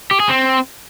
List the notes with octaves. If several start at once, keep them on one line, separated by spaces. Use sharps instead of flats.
G4
G#4
C4